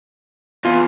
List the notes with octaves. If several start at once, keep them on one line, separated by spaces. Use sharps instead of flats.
E2 F4